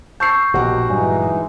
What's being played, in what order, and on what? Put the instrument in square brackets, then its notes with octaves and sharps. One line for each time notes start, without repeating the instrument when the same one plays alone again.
[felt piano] A5 E6 C7 [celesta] C#6 G6
[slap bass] A#1 B2 [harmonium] D#4 [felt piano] F#4 G4 F#5
[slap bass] G2 A#2 F#3 [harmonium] E3 G#3 D#4 [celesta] G#5